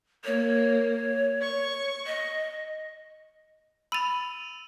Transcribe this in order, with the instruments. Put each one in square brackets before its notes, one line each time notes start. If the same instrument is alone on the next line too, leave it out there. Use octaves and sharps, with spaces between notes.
[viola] A#3 [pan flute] C#5
[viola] C#6
[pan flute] D#5
[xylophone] B5 A6 [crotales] E6 D#7 F7